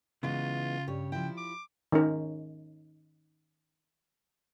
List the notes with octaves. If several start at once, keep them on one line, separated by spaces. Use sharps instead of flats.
C#3 E3 G#3 B3 F4
G2 G4 C#5
F3 E4 G5
D6
D#3 C#4 D#4 A#4